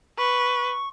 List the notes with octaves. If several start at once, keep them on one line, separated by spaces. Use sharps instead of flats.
B4 C#6